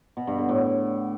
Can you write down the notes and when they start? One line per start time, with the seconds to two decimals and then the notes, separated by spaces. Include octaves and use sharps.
0.17 B2
0.27 G2
0.38 D3
0.49 A2